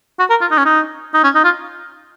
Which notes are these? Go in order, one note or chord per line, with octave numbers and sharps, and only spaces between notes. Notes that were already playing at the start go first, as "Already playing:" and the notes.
F#4
A#4
F4
D#4
C#4
D#4
D#4
C#4
D#4
F4